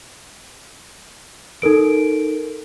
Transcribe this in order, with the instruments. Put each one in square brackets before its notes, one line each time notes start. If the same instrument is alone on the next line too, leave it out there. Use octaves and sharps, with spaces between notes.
[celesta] D#4 A4 A#4 D7